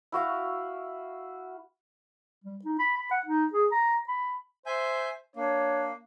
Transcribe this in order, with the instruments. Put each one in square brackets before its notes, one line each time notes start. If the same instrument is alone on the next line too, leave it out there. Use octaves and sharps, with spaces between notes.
[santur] E4 F#4 F5
[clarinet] G3
D#4
B5
B5
F#5
D#4
G#4
A#5
B5
[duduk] C5 [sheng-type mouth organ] E5 G#5 G6
[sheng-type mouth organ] A#3 [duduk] D4 [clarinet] C#5